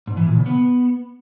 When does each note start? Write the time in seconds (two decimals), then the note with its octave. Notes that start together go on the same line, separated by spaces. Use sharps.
0.07 G#2
0.17 E3
0.27 A#2
0.36 C#3
0.46 B3